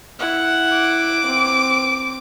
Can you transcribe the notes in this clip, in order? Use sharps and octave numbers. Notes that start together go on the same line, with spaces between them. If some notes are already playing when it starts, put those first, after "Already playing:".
E4 F#5
D6
C4